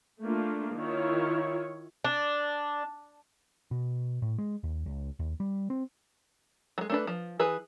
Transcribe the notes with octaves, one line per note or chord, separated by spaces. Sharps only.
A3 A#3 D4 F4
D#3 E4 F4 C#5
D4
B2
A2
G#3
D#2
C#2
D#2
G3
C4
F#3 G#3
A3 D4 B4
F3
E3 G#4 B4